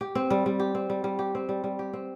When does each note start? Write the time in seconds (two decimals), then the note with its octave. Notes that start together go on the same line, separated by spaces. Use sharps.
0.01 G4
0.15 C4
0.31 G3
0.46 G3
0.60 G4
0.75 C4
0.90 G3
1.04 G3
1.19 G4
1.35 C4
1.49 G3
1.64 G3
1.79 G4
1.93 C4